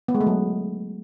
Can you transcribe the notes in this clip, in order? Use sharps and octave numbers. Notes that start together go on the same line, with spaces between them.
B3
G#3
A3
F#3